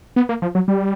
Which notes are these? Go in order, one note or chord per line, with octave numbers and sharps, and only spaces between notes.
B3
A#3
F3
F#3
G3